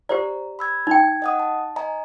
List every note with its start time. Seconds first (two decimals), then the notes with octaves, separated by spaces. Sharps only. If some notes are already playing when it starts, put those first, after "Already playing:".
0.09 G4 C5 D5 A#5
0.59 B5 E6 G#6
0.87 D#4 G5 G#6
1.22 D#5 F#5 D#6
1.39 A5
1.76 D#5 G#5 A#5